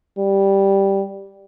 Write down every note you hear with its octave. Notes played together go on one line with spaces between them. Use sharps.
G3